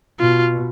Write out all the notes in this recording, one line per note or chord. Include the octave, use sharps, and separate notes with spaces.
B2 F4